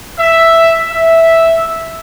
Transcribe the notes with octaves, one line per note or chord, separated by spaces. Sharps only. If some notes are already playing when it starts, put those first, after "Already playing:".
E5
E5